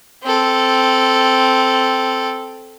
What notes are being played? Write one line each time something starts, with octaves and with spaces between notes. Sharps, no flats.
C4 A4